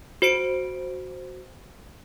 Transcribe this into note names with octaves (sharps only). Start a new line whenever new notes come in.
F#4 C5 C#7 D7